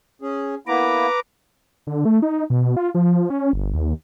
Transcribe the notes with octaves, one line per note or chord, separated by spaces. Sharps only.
C#4 G#4
A#3 B3 E4 B4 A#5 D6
D3
A3
D#4
B2
F4
F3
C#4
G1
D#2